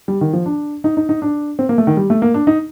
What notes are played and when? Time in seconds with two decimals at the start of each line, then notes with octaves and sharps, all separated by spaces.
0.08 G3
0.21 D#3
0.33 F3
0.46 D4
0.84 D#4
0.97 D#4
1.09 D#4
1.22 D4
1.59 C4
1.69 A#3
1.78 A3
1.87 D#3
1.97 G3
2.10 A3
2.22 A#3
2.34 D4
2.47 D#4